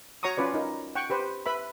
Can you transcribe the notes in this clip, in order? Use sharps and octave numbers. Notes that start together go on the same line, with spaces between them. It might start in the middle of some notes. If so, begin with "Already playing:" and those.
F#4 C#5 A#5 C#6 D#6
C#4 F4 B4 D5
D#4 A#4
F#5 G5 C#6
G4 B4 C5
B4 E5 B5